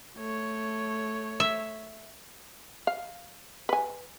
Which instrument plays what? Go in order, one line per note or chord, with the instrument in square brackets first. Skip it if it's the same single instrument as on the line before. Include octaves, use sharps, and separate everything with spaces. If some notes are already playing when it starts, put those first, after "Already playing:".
[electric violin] A3 C#5
[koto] E5
[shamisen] F5
B4 G#5